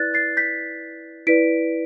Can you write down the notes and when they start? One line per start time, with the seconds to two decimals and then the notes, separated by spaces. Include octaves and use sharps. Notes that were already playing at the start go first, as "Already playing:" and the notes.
Already playing: E4 B4 D5 F#6 A6
0.14 A6 C7
0.37 G6 B6
1.27 E4 B4 D5 B6 D7